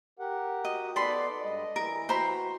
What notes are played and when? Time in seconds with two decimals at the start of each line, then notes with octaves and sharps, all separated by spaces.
0.19 G4 A#4 F#5
0.65 F#4 D#5
0.96 B3 D#4 A4 B4 D5 B5 C6
1.42 G2 G3 G#3 D#5
1.76 E3 E4 A#4
2.09 F#4 C5 A#5 B5